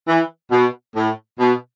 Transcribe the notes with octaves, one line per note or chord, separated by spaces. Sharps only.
E3
B2
A2
B2